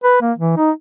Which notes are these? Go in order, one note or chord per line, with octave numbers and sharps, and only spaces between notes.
B4
A#3
E3
D#4